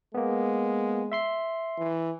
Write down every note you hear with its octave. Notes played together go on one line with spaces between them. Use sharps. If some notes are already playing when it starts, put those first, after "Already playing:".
G#3 A#3 B3
E5 C6 C7
E3